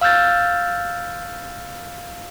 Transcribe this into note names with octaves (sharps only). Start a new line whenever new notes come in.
F5 E6 F6 G6 A6